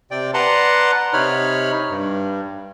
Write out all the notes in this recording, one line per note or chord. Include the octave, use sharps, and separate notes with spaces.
C3 D5 G5
B4 D5 F#5 A5 A#5 C6
C3 D#4 C#5 B5 F6
G2